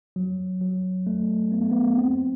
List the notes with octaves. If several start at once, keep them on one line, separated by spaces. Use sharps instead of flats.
F#3
F#3
A3
B3
A3
B3
C4